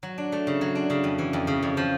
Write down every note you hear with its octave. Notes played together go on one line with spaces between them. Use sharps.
F#3
D4
A3
C#3
F#3
D4
C#3
F2
E3
F2
C#3
F2
F3